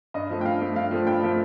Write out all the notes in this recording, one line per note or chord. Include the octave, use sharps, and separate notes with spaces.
G2 D#5
F3 A3
G5
G2 F5
F3 A3
G2 F5
F3 A3
G2 G5
F3 A3